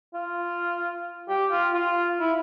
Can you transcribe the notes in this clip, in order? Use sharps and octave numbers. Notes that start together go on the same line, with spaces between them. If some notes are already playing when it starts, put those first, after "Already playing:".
F4
G4
F4
F4
E4